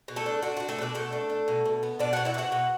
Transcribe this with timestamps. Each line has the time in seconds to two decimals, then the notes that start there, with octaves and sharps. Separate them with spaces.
0.08 B2
0.16 A3 A4
0.26 D4
0.43 D4 F#4
0.57 D4 F#4
0.69 A3 A4
0.78 B2 D4 D5
0.95 B2 A3 A4
1.12 D4
1.29 D4
1.48 B2
1.65 B2
1.83 B3
1.99 B2 D4 D5
2.13 B2 F#4 F#5
2.25 E4 E5
2.34 D4
2.38 F#4 F#5
2.52 B2